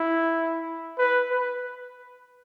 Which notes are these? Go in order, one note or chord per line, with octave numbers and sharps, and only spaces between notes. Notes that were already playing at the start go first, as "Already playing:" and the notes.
Already playing: E4
B4
B4